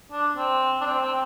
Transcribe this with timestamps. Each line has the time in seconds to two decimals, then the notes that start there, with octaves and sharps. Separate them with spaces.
0.12 D4
0.36 C4
0.81 D4
0.86 C4
1.01 C4